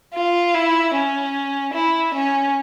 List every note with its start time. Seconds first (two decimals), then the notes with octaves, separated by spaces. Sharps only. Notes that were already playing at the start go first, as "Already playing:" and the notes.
0.15 F4
0.54 E4
0.95 C#4
1.74 E4
2.14 C#4